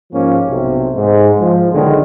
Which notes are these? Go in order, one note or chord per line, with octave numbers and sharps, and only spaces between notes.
G#2 F3 A#3 C#4
B1 C3
G#2
F3
B1 D3 D#3 G#3